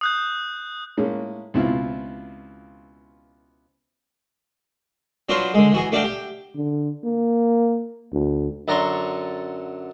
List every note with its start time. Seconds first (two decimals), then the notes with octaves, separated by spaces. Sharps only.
0.01 D#6 F#6 G6
0.97 A2 G#3 A#3 C#4
1.54 C#2 B2 C4 E4 F4
5.29 F#3 D4 F4 F#4 B4 C5
5.54 D3 G#3
5.72 E3 F#4 G#4
5.92 A3 D4 F#4 D5 F5 G5
6.04 G4
6.55 D3
7.04 A#3
8.12 D2
8.68 F#2 D3 A#5 C6 C#6